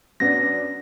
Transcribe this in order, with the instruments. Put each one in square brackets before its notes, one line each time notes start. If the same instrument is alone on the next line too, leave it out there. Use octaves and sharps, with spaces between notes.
[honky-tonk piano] F#2 B3 D4 [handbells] A#6